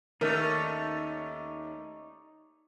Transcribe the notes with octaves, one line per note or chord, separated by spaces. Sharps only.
D#2 A3 C#4 D#4 A#4 C#5 D5